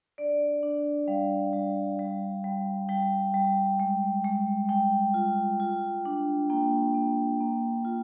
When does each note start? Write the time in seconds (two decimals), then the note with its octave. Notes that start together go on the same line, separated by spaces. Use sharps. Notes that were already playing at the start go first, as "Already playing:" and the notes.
0.18 D4 D5
0.63 D4
1.08 G3 F5
1.53 G3
1.99 G3
2.44 G3
2.89 G3 G5
3.34 G3
3.80 G#3
4.24 G#3
4.69 G#3 G5
5.14 F4
5.60 F4
6.05 D4
6.50 A#3 G5
6.94 A#3
7.40 A#3
7.85 F4